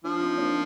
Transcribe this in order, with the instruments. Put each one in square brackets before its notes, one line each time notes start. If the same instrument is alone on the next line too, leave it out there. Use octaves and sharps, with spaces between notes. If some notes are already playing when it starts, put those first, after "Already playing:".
[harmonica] F3 [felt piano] D4 F4
[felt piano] C4 D#4
A#3 D4